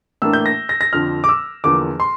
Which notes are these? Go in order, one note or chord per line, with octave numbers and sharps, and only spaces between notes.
A2 E3 A#3 D4 E6
G6
A#6
A#6
A#6
F2 D3 F3 F6
D6
E6
E2 D3 F3 A#3 D6
C6